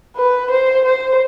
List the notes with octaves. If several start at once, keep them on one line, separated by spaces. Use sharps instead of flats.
B4
C5
C5